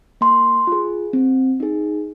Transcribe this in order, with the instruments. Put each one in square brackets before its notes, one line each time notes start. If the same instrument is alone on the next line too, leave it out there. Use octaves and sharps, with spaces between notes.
[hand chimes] A#3 C6
F4 G#4
C4
D#4 G#4